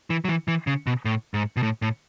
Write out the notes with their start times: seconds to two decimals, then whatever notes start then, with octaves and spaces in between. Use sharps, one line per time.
0.10 E3
0.25 F#3
0.29 E3
0.48 E3
0.67 C#3
0.87 B2
1.05 A2
1.34 G#2
1.57 B2
1.63 A2
1.82 A2